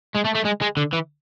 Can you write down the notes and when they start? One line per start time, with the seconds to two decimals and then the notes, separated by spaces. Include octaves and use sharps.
0.16 G#3
0.25 A3
0.35 A3
0.45 G#3
0.62 G#3
0.77 D3
0.93 E3